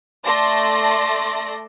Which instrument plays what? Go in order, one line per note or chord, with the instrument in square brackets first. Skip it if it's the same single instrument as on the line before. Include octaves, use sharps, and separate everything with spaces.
[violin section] A3 D5 A5 C6 A#6